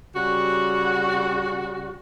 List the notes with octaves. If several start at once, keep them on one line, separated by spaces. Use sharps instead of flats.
C#3 G3 F#4